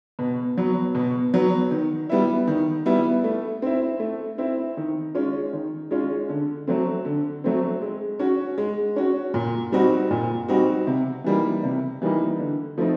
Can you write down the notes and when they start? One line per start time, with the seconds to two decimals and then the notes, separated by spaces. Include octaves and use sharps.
0.19 B2
0.58 F#3 B3
0.95 B2
1.34 F#3 B3
1.71 D#3
2.09 G3 B3 E4
2.47 D#3
2.86 G3 B3 E4
3.24 A3
3.62 C4 E4
4.00 A3
4.38 C4 E4
4.77 D#3
5.15 G#3 C#4 F4
5.53 D#3
5.91 G#3 C#4 F4
6.29 D3
6.67 F#3 A3 C4
7.05 D3
7.44 F#3 A3 C4
7.82 G#3
8.19 C#4 F#4
8.58 G#3
8.96 C#4 F#4
9.34 A#2
9.72 G3 C4 D#4 F#4
10.11 A#2
10.49 G3 C4 D#4 F#4
10.87 C3
11.24 E3 G3 A#3 D#4
11.63 C3
12.02 E3 G3 A#3 D#4
12.39 D3
12.78 F3 A3 C4 D#4